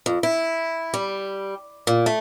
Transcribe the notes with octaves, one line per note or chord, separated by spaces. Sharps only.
F2
E4
G3
A#2
A3